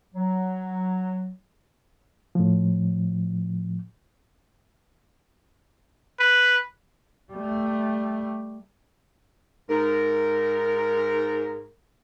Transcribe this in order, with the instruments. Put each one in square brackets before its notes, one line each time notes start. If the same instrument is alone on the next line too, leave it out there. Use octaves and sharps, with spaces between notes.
[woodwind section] F#3
[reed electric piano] A2 F3
[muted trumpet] B4
[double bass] G3 A3
[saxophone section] G#2 A#4